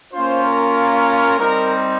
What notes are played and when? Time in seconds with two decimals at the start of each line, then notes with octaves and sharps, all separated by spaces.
0.12 A#3 C#4 F4 C5
0.44 A#4
1.39 G3 C4 D#4 A#4